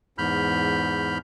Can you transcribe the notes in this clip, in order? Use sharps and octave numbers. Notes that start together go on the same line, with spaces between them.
E2 G#2 B5 F6 G6